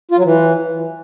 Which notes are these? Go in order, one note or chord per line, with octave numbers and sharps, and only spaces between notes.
F4
F#3
E3